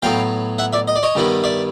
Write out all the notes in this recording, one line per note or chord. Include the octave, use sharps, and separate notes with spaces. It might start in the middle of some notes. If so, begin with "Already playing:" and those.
A2 F#3 B3 F5 G5
E5 F#5
D5 E5
D#5
D5
C#5 D#5
G2 D#3 G3 B3 E4
D5 E5